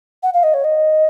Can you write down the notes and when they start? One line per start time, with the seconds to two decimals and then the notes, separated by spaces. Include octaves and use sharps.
0.23 F#5
0.34 F5
0.43 D#5
0.54 C#5
0.64 D#5